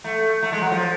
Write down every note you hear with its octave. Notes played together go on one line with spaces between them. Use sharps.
A3
A3
G#3
F#3
F3